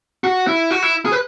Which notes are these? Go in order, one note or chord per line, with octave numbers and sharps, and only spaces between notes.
F#4
E4
F#4
E4
G#4
B4